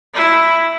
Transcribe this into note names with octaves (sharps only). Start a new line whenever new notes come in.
E4